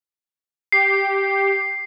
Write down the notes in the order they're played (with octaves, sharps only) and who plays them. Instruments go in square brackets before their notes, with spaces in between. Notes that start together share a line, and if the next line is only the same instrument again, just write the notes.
[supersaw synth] G4 [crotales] C7